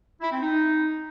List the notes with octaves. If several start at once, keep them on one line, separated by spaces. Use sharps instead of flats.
E4
C4
D#4